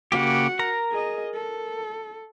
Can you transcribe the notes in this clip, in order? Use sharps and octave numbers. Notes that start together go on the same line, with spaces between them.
C#3 A#3 F#4 G4 F#5
A#4 A#5
G#4 D#5
A4